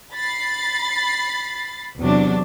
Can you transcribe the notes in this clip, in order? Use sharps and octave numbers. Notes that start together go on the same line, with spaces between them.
B5 A6 C7
E2 C3 F#3 D4